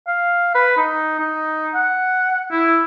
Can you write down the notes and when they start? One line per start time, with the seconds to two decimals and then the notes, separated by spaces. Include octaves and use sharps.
0.07 F5
0.55 B4
0.77 D#4
1.20 D#4
1.74 F#5
2.52 E4